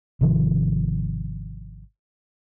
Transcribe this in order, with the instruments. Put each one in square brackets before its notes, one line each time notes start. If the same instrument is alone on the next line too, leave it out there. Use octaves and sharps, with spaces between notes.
[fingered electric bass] G#1 C3 D#3 F3